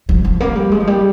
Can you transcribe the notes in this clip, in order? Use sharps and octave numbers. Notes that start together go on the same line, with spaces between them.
F3
F3
A#3
G3
G#3
F3
G3